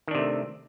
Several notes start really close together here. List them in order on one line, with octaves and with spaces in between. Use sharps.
D#3 D4 C3 A3